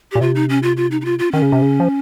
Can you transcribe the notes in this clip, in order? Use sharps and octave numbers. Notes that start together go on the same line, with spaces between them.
A#2 G4
C3 F4
D#4
C#4
F4
F4
D#4
D#4
F4
F4
D#3 C#4
C#3
C3
C#3
F3